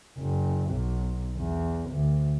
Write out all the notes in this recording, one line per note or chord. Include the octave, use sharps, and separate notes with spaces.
F#1
B1
E2
D2